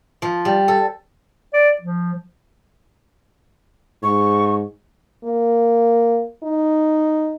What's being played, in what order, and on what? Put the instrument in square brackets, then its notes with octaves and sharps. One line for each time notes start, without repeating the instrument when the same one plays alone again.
[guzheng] F3
G3
A4
[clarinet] D5
F3
[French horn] G#2 [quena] C#6
[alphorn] A#3
D#4